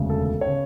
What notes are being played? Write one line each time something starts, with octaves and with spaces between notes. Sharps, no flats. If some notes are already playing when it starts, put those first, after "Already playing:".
Already playing: E1 D2 C#3
A4
A4
C#5
C#3